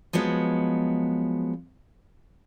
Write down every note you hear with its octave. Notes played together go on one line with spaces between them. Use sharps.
F3 F#3 G#3 B3